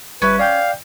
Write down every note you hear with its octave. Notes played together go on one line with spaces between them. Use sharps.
G1 G3 C#4 B4 E5
D5 F5 G5 G6